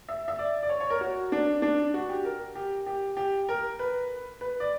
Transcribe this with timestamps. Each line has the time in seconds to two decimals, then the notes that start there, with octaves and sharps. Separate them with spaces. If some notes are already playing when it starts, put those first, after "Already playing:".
0.09 E5
0.28 E5
0.39 D5
0.63 D5
0.69 C#5
0.80 C#5
0.90 A#4
1.01 F#4
1.32 D4
1.62 D4
1.94 F#4
2.09 G4
2.25 A#4
2.55 G4
2.86 G4
3.17 G4
3.49 A#4
3.79 B4
4.41 B4
4.60 D5